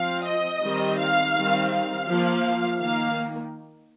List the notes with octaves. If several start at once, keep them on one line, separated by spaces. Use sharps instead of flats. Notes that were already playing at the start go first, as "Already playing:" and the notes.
Already playing: F3 C4 F5
D#5
D#3 G3 C4
F5
D#3 G3 C4
F5
F3 A#3
D#3 A#3 F5